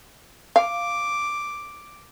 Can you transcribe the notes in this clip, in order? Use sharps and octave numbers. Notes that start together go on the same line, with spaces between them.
F5 D6